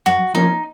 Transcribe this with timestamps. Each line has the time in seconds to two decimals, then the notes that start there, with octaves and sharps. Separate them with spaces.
0.06 F#2 F#4
0.34 F3 A#3 C#4 D#4